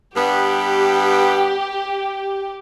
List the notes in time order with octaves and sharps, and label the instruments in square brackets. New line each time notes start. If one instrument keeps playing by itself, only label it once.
[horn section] G2 G3 B3 [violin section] G4